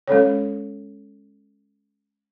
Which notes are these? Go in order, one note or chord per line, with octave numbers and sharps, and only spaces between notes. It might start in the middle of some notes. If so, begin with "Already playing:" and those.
G#3 C#4 A4 C#5